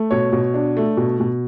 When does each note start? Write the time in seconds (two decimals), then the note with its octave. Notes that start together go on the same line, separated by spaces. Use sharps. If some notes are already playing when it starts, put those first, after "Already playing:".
Already playing: A3
0.11 B2 C#5
0.32 B2
0.54 D4
0.77 A3
0.97 B2
1.20 B2